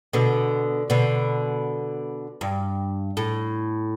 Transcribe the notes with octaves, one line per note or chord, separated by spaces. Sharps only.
B2 D3
B2 D3
G2
A2